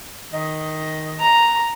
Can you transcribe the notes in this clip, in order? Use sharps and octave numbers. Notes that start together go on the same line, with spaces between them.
D#3 D#5
A#5